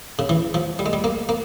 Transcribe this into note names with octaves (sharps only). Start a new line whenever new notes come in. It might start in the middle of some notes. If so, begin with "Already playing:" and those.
C#3
E3
F3
G3
G#3
G3
A#3
A#3